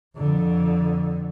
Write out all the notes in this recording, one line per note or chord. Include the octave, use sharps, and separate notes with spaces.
F2 D3